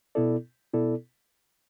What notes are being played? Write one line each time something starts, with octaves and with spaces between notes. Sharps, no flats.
B2 B3 E4 A4 D5
B2 B3 E4 A4 D5